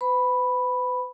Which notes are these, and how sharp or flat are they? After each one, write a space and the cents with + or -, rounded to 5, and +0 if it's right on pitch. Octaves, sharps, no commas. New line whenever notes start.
B4 +40 B5 +0